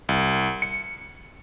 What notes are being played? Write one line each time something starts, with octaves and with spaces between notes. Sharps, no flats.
C2
C#7